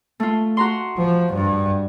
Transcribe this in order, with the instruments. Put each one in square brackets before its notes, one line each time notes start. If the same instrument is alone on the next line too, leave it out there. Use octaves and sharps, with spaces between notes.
[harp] A3 F4
F#4 A#5 C6
[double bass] F3
G2